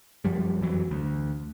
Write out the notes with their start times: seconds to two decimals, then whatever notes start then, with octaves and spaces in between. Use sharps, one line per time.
0.25 F#2 F3 G3
0.61 F2 E3 F#3
0.91 D2